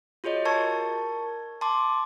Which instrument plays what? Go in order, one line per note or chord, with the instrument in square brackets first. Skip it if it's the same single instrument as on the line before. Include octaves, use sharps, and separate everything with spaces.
[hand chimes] F4 F#4 G#4 C#5 D#5
A#4 A5 C#6 G#6
A5 C6 D6